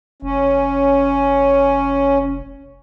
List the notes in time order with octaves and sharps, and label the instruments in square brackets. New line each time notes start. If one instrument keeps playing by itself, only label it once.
[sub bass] F1 [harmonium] C#4